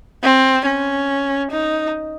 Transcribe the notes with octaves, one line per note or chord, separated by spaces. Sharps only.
C4
C#4
D#4